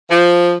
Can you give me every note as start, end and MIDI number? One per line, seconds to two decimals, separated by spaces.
0.11 0.56 53